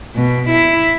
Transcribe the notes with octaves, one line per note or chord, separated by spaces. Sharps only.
B2
E4